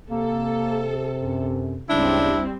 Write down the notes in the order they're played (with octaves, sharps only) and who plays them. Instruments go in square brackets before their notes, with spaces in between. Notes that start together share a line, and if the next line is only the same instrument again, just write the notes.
[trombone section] C3 [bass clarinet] A#3 [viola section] A4
[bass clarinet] F#2
[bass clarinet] D2 [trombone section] G#2 C#3 [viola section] G3 C4 [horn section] D4 E4